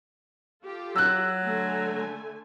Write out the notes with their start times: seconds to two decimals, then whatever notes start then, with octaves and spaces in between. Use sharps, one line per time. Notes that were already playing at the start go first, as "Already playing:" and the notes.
0.64 F4 G4 A4
0.96 F#3 E6 F#6
1.42 D3 A3 G#5